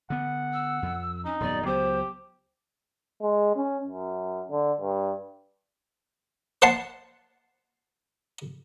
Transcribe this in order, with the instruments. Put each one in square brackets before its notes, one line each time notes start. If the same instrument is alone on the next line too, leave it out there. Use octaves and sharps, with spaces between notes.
[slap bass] D3 B3 [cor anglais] F#5
[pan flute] E6
[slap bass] F2
[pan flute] C#4 [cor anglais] D#4
[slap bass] D#1 F#2 B3 [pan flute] D5
[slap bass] C#2 F#3 B3 [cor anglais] G4 [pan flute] C5
[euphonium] G#3
C#4
F#2
D3
G2
[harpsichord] C5 F#5 A5 C6